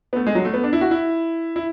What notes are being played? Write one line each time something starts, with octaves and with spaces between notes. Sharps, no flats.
B3
A3
G#3
F#3
A3
B3
D4
E4
F#4
E4
E4